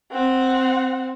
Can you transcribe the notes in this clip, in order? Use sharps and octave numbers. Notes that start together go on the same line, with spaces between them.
C4 F#5